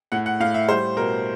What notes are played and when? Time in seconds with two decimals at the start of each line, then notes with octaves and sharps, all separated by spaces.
0.12 A2 F#5
0.26 F#5
0.40 A2 F5
0.54 E5
0.69 G3 C5
0.97 B2 A#4